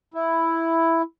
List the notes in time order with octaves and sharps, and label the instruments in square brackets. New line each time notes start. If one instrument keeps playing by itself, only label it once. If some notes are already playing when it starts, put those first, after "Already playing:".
[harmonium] E4